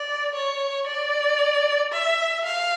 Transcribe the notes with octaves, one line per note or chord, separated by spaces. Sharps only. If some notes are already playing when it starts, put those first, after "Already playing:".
Already playing: D5
C#5
D5
E5
F5